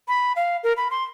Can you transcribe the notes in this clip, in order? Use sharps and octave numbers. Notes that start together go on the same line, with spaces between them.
B5
F5
A#4
B5
C6